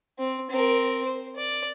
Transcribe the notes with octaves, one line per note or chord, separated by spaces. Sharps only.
C4
C4 A#4
C5
D5